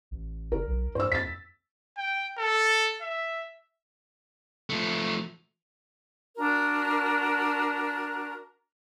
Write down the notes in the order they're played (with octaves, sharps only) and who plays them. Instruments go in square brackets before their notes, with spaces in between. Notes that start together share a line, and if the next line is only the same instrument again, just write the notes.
[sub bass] A1
[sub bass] F#1 [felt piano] A#4
[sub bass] B1
[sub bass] G2 [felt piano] C5 E6
[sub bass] F2 [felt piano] A6 B6
[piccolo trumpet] G5
A4
E5
[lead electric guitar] F3 A3
[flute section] D4 F#4 A#4